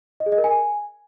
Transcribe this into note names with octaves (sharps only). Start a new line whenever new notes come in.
D#5
G#4
D#5
A#4
G#5